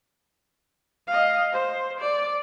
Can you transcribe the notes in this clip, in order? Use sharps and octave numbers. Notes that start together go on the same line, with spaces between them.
D#5 F5
C5
D5